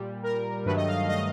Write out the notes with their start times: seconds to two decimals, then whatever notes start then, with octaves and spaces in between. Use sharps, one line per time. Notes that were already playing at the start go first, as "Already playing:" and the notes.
Already playing: A#2 G3
0.23 A#4
0.65 G2 D#3 F#3 A3 B4
0.76 D#5
0.87 F5
1.09 D#5